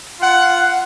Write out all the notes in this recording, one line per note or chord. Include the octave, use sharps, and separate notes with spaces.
F4 F#5